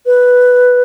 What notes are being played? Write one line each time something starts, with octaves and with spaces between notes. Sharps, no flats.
B4